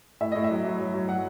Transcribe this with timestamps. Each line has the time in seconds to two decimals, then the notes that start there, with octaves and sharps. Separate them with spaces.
0.20 A2 E5
0.32 A2 D#5
0.44 E5
0.50 F#3
0.64 F#3
0.80 F#3
0.94 F#3
1.08 F#3 F#5